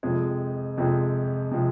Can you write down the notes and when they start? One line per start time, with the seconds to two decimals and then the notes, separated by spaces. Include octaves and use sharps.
0.03 F2 C3 F3 G#3
0.77 F2 C3 F3 G#3
1.52 C3 F3 G#3